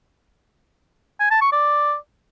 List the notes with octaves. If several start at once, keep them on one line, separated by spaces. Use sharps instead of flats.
G#5
A5
C#6
D5